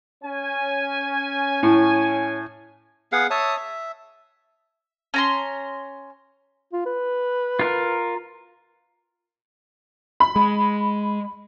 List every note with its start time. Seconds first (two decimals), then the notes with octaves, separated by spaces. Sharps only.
0.24 C#4 G#5
1.63 A2
3.12 B3 G#4 F5 F#5
3.30 C#5 E5 A5 D#6
3.57 E5
5.14 C#4 A#5 C6
6.73 F4
6.86 B4
7.59 F4 A#4
10.20 B5
10.36 G#3